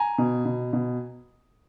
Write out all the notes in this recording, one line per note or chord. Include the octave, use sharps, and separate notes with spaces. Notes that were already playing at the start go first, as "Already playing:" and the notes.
Already playing: G#5 A#5
B2
B2
B2